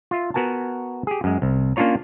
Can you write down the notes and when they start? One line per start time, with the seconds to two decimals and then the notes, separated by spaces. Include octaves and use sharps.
0.11 F4 E5
0.34 B3 F#4 A#4 G#5 A5
1.07 G4 G#4
1.24 F#2 G#3
1.42 C2
1.76 A#3 C#4 D4 F4 C#5 A#5